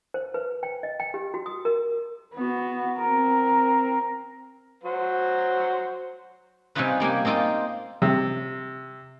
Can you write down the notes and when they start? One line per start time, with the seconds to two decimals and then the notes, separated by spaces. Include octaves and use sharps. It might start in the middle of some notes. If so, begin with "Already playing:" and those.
0.14 C5
0.34 B4
0.63 G5
0.83 D#5
1.00 G5
1.14 G4
1.34 F#4
1.46 D#6
1.65 A#4
2.34 B3 F#4
2.99 C4 A#4
4.84 F#3 F#4 C5
6.75 C3 G3 C#4 D#4 F4 B4
7.00 G3 A#3 G4 G#5
7.25 A#3 C4 D#4 F4 C5
8.02 C3